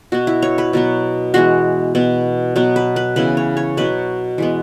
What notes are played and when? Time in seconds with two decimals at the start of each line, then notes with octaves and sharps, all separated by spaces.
0.12 B2 B3 F#4
0.27 E4
0.42 C#5
0.58 B4
0.73 B2 F#3 B3
1.34 E3 G#3 B3 F#4
1.95 B2 B3
2.56 B2 F#3 B3 B4
2.76 B4
2.96 B4
3.16 C#3 E3 B3 B4
3.37 C#5
3.57 C#5
3.77 B2 F#3 B3 B4
4.38 E3 G#3 B3